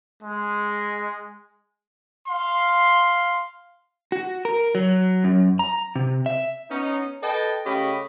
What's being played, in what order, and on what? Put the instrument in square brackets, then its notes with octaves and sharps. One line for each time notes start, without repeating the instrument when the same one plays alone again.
[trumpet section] G#3
F5 C6
[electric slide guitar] F#4
A#4
F#3
F#2
A#5
C3
E5
[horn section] B3 C#4 D#4
A4 B4 D#5 G5 A5
C#3 A3 C#4 G4 D#5 B5